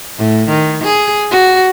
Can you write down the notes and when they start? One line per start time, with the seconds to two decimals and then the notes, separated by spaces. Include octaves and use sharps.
0.18 A2
0.49 D#3
0.84 G#4
1.31 F#4